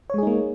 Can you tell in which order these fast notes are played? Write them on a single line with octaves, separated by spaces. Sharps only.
C#5 G#3 G#4 D#4 A#3